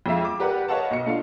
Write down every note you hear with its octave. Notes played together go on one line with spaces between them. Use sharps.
F2 G#3 E5 F5
D6
G4 A#4 B4 D5 F#5
B4 C#5 D#5 F5 F#5 A5
B1 D#5 C#7
A3 D4 F4 F5